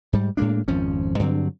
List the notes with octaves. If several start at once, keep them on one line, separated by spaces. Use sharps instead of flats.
G#2 G3
A2 G#3 A#3 D4
G#1 F2 F3 C#4
G2 D3 F#3 C4